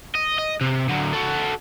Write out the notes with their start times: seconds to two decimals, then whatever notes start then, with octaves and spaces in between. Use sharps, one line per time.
0.15 D#5
0.38 D#5
0.61 C3
0.89 D2 F#3
1.14 F#4 A4